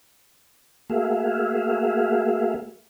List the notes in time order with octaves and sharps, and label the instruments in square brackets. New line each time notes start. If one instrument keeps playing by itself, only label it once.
[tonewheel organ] A3 A#3 F#4 G#4 E5 F5